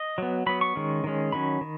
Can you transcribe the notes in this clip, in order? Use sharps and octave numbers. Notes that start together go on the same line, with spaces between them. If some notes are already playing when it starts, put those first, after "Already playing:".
Already playing: D#5
F#3 B3
F#3 B3 B5
C#6
D#3 G#3 C#4
D#3 G#3 C#4
D#3 F#3 C#4 B5
D#3